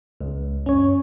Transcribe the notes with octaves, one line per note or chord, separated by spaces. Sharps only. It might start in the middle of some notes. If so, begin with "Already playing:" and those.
C#2
F#2 C#4 C#5